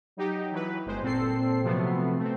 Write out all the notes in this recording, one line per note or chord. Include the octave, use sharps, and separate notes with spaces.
F#3 D#4 G4
E3 F#3 B4
G1 G#3 C5
A#2 C4 A4 C7
C3 F3 F#3 A3 B3
A3 C4